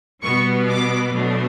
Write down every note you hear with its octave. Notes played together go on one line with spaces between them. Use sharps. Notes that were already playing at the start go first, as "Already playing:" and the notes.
B2 G3 B3 C#6
D6
B2 F#3 A3 D4